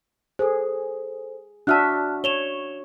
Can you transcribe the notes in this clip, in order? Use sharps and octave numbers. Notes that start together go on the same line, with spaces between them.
G#4 A4 C5
D4 F#4 E5 A5 F6 F#6
C#5 E7 F7 G7